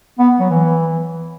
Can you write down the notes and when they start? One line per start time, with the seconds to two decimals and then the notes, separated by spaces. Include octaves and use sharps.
0.19 B3
0.39 F#3
0.50 E3